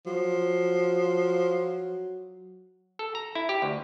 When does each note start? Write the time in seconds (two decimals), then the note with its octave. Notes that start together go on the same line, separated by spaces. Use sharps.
0.06 F3 F#3
2.99 A4
3.15 A#5
3.35 E4
3.49 G4
3.62 D2